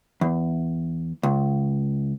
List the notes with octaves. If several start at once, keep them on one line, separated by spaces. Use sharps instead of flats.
E2
C#2